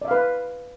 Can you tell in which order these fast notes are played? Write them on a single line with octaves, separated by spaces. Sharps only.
D5 E5 F5 B4